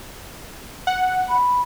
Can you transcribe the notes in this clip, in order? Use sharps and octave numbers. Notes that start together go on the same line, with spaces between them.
F#5
B5